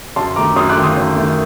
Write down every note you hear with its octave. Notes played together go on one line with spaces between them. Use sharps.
F#2 A5 C6
D#3 A3 A#5 D6
F#2 C6 D#6
D6 F#6
D#3 A3
C6 D#6
F#2
D#3 A3